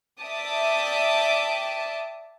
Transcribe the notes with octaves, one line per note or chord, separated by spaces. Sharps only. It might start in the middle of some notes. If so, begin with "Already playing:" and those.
D5 E5 G5 A5 D6 D#6